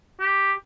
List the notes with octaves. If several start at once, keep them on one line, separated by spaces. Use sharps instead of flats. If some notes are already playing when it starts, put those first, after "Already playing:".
G4